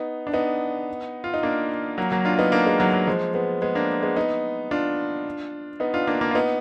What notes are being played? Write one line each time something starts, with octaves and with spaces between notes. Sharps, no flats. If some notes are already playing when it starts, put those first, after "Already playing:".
Already playing: B3 D#4
D4
B3 D#4
F4
D#4
A#3 D4
F#3 A#3
F#3 A#3
D4 F4
B3 D#4
A#3 D4
G#3 B3
F#3
F#3
F3 G#3
G#3 B3
G#3 B3
A#3 D4
G#3 B3
B3 D#4
D4 F4
B3 D#4
D4 F4
A#3 D4
A#3 D4
F4
B3 D#4